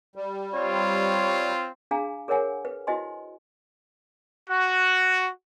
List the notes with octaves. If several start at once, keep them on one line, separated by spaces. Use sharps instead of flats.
G3
C4 F4 C#5
D4 G#4 F5 G#5 A#5
G#4 A#4 C#5 F#5 G#5
B4
E4 F#4 C5 D#5 G#5 C6
F#4